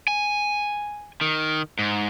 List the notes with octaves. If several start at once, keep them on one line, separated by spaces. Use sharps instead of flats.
G#5
D#3
G#2